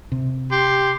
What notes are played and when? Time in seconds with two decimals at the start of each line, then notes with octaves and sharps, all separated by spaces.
0.12 C3
0.52 G4 C6